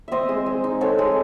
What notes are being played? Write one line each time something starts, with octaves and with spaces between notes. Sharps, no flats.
C4 C5 D#5 E5
G#3
G#3
D#4
C4 A4 C#5
G#3